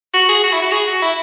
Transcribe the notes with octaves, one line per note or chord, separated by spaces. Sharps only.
F#4
G#4
F#4
E4
F#4
G#4
F#4
E4